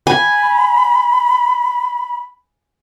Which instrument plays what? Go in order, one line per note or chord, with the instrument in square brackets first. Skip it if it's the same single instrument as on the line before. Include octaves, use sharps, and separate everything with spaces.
[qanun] G#5 [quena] B5